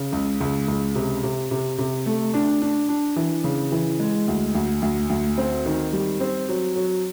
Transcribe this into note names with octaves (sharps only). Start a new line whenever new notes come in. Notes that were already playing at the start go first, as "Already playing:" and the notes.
Already playing: C#3
C#2
C#2
C#2
C3
C3
C3
C3
A3
D4
D4
D4
E3
C#3
E3
G#3
D2
D2
D2
D2
C4
D#3
G3
C4
F#3
F#3